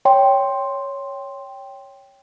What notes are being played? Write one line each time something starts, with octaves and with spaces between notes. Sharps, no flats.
C#5 G5 C6